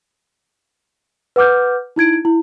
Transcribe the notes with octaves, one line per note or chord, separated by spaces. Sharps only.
B4 F#5 D6 F6 G6
D#4 E4 G#6 D7
E4